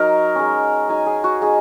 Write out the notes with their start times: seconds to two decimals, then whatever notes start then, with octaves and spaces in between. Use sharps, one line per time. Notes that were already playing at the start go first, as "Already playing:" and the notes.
Already playing: F#3 D#4 A#4
0.35 G#3 C#4
0.89 F#3 D#4 G#5
1.06 G#4
1.24 F#4
1.41 G#3 D#4 G#4